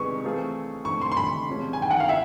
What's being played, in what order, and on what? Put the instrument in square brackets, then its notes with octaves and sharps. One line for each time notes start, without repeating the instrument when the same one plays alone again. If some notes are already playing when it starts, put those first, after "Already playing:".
Already playing: [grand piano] C2 C3 E3 G#3 B3 [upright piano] C#6
[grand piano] E3 A3 C4 F4 G#4
[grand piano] D3 F3 A3 C4 E4 [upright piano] C#6
[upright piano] C6
C6
B5
[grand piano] E2 C3 F3 G#3 C#4
[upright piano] G#5
G5
F#5
F5
[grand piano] E4 [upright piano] E5